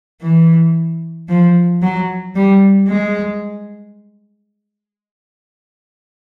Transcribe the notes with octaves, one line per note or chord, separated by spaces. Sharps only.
E3
F3
F#3
G3
G#3